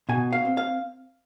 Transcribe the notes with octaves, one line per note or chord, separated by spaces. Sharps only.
B2 G#5
F5
C4
F5